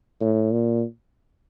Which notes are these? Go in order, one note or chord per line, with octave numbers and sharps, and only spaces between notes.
A2
A#2